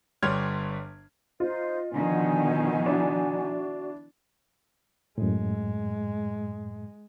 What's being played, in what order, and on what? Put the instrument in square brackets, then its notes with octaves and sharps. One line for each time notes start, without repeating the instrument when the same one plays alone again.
[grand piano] G1 G3 C#5 C6 F6 G#6
[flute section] D#4 C5 [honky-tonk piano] F4 [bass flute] D#5
[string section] B2 D#3 F3 [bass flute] D3 [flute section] D#4 F#5 G#5
[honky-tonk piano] D4 E4 [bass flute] F#4
[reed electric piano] F#2 A2 [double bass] G#3